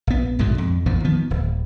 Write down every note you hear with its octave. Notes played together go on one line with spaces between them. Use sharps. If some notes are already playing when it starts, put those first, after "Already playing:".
A#1 B3
A#1 G#2 B2 D3
F2
A#1 E2 A#2 F3
D#3 F3 B3
D1